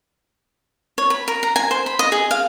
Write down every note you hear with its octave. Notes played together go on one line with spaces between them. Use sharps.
C#5
B5
A#4
A#5
G#5
C5
B5
D#5
G#4
F5